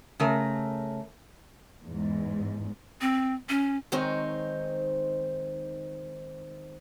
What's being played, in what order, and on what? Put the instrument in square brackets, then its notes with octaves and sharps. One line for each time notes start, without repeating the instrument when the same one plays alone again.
[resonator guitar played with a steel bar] C#3 A3 A#4
[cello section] E2 G#2
[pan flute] C4
C#4
[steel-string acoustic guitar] D#3 G#3 C4 D#4 C5 C#5